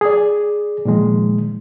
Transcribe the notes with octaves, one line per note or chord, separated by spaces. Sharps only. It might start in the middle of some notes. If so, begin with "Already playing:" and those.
G#4 D5
A#2 D#3 F3 G#3